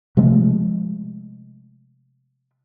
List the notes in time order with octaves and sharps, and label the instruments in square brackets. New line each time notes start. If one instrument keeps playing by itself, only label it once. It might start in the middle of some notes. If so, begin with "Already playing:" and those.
[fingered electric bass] C3 F3 G#3 A3